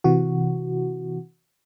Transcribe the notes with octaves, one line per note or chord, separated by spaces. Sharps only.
C3 E3 F#4